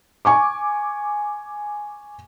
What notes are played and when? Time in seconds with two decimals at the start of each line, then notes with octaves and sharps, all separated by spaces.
0.25 G#5 C#6 D6